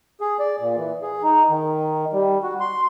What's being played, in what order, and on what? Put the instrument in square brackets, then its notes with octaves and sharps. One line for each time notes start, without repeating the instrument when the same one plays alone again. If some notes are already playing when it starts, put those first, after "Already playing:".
[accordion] G#4
D5
A#2
E3
G#4
D#4
D#3
G3
F#4
C6